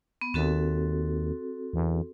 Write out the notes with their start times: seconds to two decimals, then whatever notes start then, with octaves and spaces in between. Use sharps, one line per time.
0.21 B3
0.34 D#2 C4 F#4 A4
1.73 E2